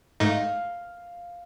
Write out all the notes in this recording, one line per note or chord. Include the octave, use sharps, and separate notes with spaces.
G#2 A3 D#4 F5